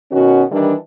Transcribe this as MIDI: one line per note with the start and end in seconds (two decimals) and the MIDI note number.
0.12 0.43 47
0.12 0.43 51
0.12 0.43 61
0.12 0.43 66
0.51 0.74 51
0.51 0.74 52
0.51 0.74 55
0.51 0.74 62